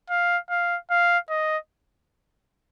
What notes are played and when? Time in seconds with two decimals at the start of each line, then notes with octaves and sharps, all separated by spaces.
0.10 F5
0.50 F5
0.90 F5
1.30 D#5